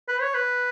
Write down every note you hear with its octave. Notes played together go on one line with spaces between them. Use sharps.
B4
C#5
B4